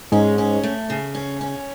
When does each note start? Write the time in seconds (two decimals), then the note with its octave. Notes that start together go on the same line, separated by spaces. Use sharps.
0.12 G#2 G#3 C#4
0.38 C#4
0.63 A3
0.90 C#3
1.15 C#4
1.41 C#4